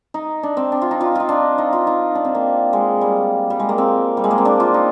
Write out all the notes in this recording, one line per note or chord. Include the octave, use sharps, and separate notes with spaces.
D#4
D4
C4
D4
F4
D#4
F4
D#4 F4
D4
D#4
F4
D#4
D4
C4
A#3
G#3
G3
G3
G#3
A#3
C4
G3
G#3
A#3
C4
D4
F4
D#4